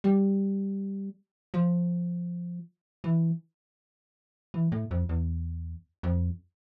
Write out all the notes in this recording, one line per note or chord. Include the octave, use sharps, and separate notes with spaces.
G3
F3
E3
E3
A2
F2
E2
F2